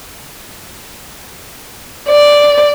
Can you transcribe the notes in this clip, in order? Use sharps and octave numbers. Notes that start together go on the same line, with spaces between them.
D5